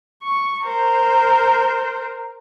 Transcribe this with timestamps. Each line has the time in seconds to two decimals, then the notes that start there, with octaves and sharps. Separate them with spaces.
0.23 C#6
0.64 A#4 C5